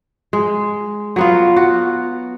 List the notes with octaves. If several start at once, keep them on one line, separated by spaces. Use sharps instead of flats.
G#3
F#3 B3 F4
F#4